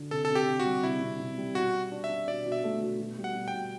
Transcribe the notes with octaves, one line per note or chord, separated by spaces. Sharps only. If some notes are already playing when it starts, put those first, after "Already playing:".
Already playing: D3
C3 A4
A4
C3
G4
C3
F#4
G3
C3 E4
C3
C3
G3
B2 F#4
B2
D4
E5
D4
B2 D5
B2
E5
A3
B2
B2
G3
F#5
B2
G5
B2